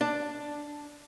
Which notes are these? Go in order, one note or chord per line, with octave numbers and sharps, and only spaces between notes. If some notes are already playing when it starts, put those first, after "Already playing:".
D4